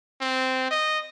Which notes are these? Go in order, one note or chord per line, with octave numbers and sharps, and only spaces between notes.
C4
D#5